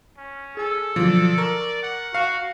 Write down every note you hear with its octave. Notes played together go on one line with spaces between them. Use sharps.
C#4
G#4 A4 G#5
B2 D3 F3 F#3 D5
A#4 A#5 C#6
F#5
F#4 F5